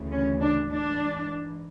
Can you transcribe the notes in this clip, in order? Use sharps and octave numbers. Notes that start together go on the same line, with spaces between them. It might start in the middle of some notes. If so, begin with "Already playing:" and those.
Already playing: D2 C#3 E3
C#4
D4
G#2 E3 D4